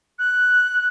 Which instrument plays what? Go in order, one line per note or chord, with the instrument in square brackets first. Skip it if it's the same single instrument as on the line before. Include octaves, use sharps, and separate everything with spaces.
[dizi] F#6